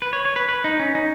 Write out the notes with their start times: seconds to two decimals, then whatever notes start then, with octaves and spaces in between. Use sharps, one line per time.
0.02 B4
0.13 C#5
0.25 C#5
0.36 B4
0.48 B4
0.64 D#4
0.80 C#4
0.95 D#4